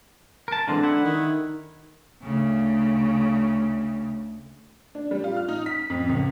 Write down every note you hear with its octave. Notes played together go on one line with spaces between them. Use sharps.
A#4 A5
D3 E3 G#3 C4
E4 F#5
D#3
D2 C#3
D4
G3
F4
F6
D#4
B6
F2
C#2